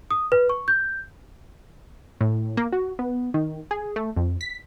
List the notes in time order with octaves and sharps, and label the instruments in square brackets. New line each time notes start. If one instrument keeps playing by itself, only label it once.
[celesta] D#6
B4
C#6
G6
[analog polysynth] A2
A#3
F#4
B3
D#3
G#4
A3
F2
B6